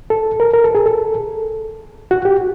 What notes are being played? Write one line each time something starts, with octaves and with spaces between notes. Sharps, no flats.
A4
A#4
A#4
A4
G#4
A4
F#4
G4